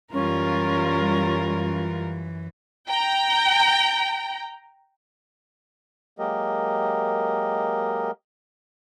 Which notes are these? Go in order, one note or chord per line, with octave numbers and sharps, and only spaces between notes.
F#2 E3 G3 C#4 F4 A#4
G5 A#5
F#3 G#3 A#3 G4 A#4 D#5